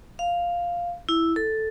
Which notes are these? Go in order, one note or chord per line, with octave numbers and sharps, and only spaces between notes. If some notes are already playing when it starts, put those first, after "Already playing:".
F5
E4
A4